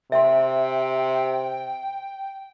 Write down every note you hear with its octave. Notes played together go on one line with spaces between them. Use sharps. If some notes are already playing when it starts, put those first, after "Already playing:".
C3 E5 G5 C6